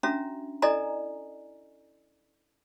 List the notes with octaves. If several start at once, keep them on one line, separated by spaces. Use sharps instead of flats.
C#4 D4 F#4 E5 A#5
E4 A4 D5 D#5 G#5 A#5